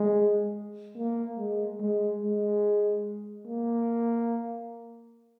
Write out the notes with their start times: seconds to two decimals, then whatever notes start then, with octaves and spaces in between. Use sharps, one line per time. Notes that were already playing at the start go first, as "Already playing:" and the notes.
Already playing: G#3
0.96 A#3
1.38 G#3
1.80 G#3
2.22 G#3
3.46 A#3